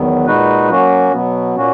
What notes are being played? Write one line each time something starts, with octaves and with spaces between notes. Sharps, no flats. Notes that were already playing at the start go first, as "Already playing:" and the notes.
Already playing: E2 D#3 F#3 B3
A#2 G#3 D#4 F#4 B4
F#3 A#3 C#4 F#4
B2 F#3 B3
A#2 A#3 C#4 F#4